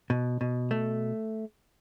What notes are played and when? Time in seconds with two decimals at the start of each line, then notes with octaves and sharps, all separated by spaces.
0.10 B2
0.41 B2
0.71 A3